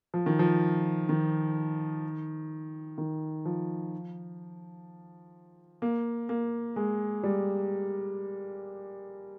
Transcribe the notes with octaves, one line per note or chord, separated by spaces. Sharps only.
F3
D#3
F3
D#3
D#3
F3
A#3
A#3
G#3
G3